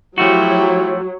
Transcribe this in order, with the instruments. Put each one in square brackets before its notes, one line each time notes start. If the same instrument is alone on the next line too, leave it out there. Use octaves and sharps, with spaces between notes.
[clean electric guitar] F3 A3 F#4 [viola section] F#3 [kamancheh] E4 G4